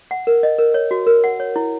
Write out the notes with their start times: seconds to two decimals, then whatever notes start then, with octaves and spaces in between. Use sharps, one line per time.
0.11 F#5
0.27 A#4
0.43 D#5
0.59 A#4
0.74 C#5
0.91 F#4
1.07 A#4
1.24 F#5
1.40 C#5
1.56 E4